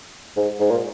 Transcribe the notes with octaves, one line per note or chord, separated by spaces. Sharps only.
G#2
G#2
A#2